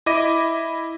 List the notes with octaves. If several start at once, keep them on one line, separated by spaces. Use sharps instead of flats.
E4 D#5 B5 D6 A#6 D#7